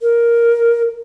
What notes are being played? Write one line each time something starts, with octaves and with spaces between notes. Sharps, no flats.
A#4